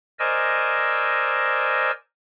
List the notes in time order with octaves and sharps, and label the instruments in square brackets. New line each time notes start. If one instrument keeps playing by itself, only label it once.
[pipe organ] A#4 C5 D5 D#5 G#5 E6